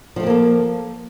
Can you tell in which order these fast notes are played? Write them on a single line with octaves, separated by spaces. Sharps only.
F3 A3 C4 A#3 A4